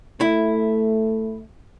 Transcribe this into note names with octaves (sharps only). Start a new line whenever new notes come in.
A3 E4